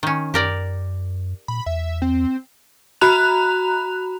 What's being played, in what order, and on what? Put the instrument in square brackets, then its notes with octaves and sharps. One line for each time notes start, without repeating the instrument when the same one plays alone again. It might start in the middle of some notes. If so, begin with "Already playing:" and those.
[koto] D#3 C#4
[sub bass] F#2 [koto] G4 A#4 D5
[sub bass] A#2 [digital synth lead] B5
[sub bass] E2 [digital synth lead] E5
[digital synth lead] C4
[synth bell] F#4 A#5 B5 F#6 F7